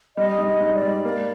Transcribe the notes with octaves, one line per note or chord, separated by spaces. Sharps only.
G3 D#5
G#2
D#5
G#2
D5
G3
A#3 D5